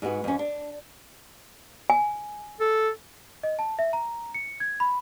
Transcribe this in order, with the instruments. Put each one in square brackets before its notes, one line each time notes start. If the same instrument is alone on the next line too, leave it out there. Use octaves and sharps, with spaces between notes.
[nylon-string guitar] G#2 G#3 B3 F#4
F2 C#4
D4
[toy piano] G#5
[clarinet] A4
[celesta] D#5
A5
E5
A#5
C#7
G#6
B5